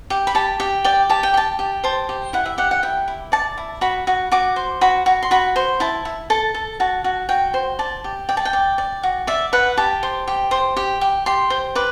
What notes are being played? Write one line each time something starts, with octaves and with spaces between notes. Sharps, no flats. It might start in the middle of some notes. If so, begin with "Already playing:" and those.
G4
B5
G4 A5
G4
D5 G5
G4 A5
G5
G4 A5
G4
C5 A5
G4
E4 F#5
E5
G4 F#5
F#5
E4 G5
E4
D5 A5
E4
F#4 B5
F#4
F#4 D6
C5
F#4 B5
F#4
C6
F#4 B5
C5
E4 A5
E4
A4 A5
A4
F#4 A5
F#4
F#4 G5
C5
D5 A5
G4
D5 G5
A5
G5
D5
D5
F#4
D5 E5
B4 F#5
G4 A5
C5
G4
C5
G4
G4
G4 C6
C5
B4 D6